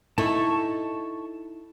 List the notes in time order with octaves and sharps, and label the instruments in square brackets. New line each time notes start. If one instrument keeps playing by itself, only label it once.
[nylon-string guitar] D#4 E4 A4 [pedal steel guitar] A5 C#6